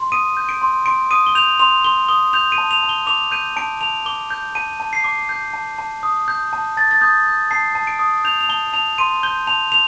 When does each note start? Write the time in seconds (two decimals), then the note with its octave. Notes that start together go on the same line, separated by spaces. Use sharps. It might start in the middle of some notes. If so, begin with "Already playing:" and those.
Already playing: C6
0.12 D#6 D#7
0.37 G6
0.49 D7
0.62 C6
0.86 C6 D7
1.11 D#6 D#7
1.27 G7
1.35 G6 F7
1.59 C6 F7
1.84 C6 G7
2.09 D#6 G7
2.33 G6 F7
2.52 D#7
2.58 A5
2.71 F7
2.83 A5
2.89 G7
3.07 D6 F7
3.31 G6 D#7
3.56 A5 D7
3.81 A5 F7
4.06 D6 G7
4.30 G6
4.55 A5 D#7
4.80 A5
4.93 C7
5.04 D6
5.29 G6
5.53 A5
5.78 A5
6.03 D#6
6.28 G6
6.53 A5
6.77 A5 A6
6.91 A6
7.01 D#6 G6
7.26 G6
7.51 A5 C7
7.75 A5
7.87 D7
7.99 D#6
8.24 G6 F7
8.41 F7
8.49 A5 G7
8.73 A5 F7
8.98 C6 D#7
9.23 G6 G7
9.47 A5 F7
9.72 F7